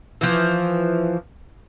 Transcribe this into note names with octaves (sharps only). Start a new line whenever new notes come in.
E3 F3